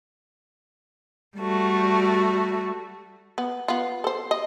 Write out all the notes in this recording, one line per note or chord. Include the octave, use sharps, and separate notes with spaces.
G3 A3 F#4
B3
B3 F4
A4 C5
D#5